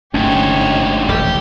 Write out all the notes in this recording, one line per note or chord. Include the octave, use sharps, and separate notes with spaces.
G1 D2 G#2 A3 C#4 G4 C#5
D#1 A1 G4